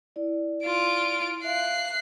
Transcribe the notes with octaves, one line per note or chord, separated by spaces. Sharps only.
E4 D5
F4 D7
E5 F5 F#6 C7